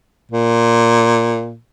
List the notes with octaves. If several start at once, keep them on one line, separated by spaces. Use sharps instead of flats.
A#2